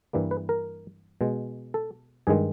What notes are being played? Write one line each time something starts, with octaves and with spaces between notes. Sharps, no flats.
G2 E3 G3 A#3
B4
A#4
B2 G#3
A4
G2 D#3 G#3 G#4